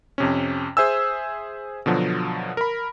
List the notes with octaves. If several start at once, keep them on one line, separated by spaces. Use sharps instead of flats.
F2 C3 C#4
G#4 C5 E5 G#5 E6
B2 D3 F3 F#3
A#4 B5